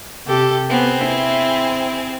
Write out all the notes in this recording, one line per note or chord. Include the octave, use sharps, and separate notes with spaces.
C3 G4 A4
B3 C4 G#4
E4